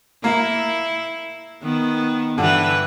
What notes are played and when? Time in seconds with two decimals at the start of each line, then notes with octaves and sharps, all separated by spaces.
0.24 A#3 E4
1.62 D#3 B3
2.38 G2 D3 E3 B4